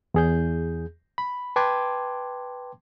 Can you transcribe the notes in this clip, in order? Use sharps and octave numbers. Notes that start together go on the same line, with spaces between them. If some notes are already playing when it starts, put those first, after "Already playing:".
E2 G#4 G6
B5
B4 G5 A5 C6 D6 G#6